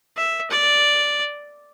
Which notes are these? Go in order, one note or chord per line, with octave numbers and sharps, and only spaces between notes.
E5
D5